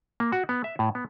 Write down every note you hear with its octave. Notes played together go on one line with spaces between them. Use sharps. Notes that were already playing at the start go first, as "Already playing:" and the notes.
A#3
F#4
B3
E5
A2
B3